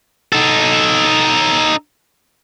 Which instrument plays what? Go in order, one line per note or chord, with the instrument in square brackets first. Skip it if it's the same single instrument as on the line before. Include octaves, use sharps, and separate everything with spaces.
[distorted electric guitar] D#4 A4